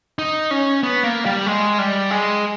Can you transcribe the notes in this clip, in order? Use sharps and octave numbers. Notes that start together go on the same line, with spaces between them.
D#4
C#4
B3
A#3
G3
G#3
G3
G#3